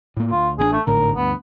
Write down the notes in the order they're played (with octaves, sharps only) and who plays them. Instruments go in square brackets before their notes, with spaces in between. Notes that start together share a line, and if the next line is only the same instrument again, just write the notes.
[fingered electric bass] A2 A#3
[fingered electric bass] D2 [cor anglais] F4
[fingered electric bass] A1 C4 D4 [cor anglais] G#4
[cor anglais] A3
[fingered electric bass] G#1 A2 D3 [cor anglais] A#4
[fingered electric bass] D2 G2 [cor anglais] B3